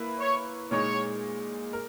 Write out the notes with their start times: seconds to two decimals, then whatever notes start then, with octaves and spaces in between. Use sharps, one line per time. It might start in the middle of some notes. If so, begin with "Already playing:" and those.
Already playing: A#3 E4 B4
0.20 C#5
0.71 A#2 G#3 D#4 C#5
1.73 A#4